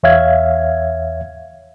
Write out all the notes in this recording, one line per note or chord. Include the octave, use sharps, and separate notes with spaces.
E2 C#5 E5 F5 G#6